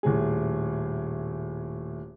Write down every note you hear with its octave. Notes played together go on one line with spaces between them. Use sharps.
D#1 A2 G#4